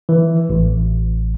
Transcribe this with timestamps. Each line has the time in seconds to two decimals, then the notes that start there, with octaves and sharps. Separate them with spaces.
0.09 E3
0.50 A1